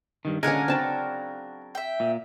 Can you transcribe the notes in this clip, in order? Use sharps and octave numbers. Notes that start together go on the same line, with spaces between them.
G2 D#3
A#2 D3 G#3 C#4 A#4 F5 F#5 G#5
C#3 F#3 C4 D4 A5
E5 G5
A#2